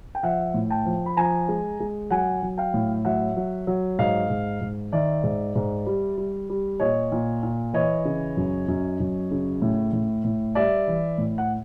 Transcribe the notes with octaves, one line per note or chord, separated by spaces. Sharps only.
G5
F3 E5 F#5
A2
G5 A5
F3
B5
F3 G#5 A#5
G#3
G#3
F#3 F#5 G#5
F#3
F5 G5
A2
F#3 E5 F#5
F#3
F#3
G#2 D#5 F5
G#2
G#2
D#3 D5 E5
G#2
G#2
G3
G3
G3
A#2 C#5 D#5
A#2
A#2
E3 C#5 D#5
C#3
F#2
F#2
F#2
C#3
A2
A2
A2
G3 D5 E5
E3
A2
F#5